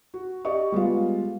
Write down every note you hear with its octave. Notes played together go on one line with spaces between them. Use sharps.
F#4
G4 D5 D#5 C#6
G3 G#3 B3 F4